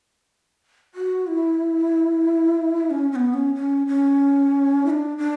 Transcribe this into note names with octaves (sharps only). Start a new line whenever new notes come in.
F#4
E4
C#4
C#4
B3
C#4
C#4
C#4
E4
D4
D4